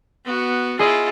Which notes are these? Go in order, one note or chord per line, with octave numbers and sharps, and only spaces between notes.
B3 F#4
E4 F4 G#4 D#5